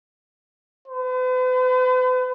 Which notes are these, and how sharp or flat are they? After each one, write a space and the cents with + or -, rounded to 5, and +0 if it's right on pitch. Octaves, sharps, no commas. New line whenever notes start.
B4 +45